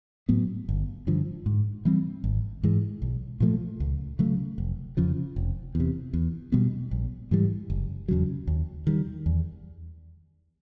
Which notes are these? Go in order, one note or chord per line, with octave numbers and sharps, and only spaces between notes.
A2 F#3 B3
G1
G2 D3 F3
G#2
E3 G3 C4
G#1
G#2 E3 G#3
B1
A#2 F3 A3
C#2
C#3 F#3 A3
F1
F2 C#3 F3
F1
E2
C3
E2
B2 G3 B3
A#1
G#2 E3 G3
F#1
E2 C#3 F#3
D#2
D#3 G3
E2